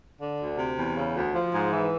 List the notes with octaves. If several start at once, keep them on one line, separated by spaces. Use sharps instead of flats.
D3
D2
C3
E2
C#3
D2
F3
G#2
E3